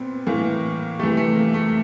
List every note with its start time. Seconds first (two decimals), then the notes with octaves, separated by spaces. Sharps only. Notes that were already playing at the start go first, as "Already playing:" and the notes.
Already playing: A#2 B3 C4
0.27 A2 E3 A#3
0.99 C3 E3 A3
1.17 A3
1.36 A#3
1.54 A3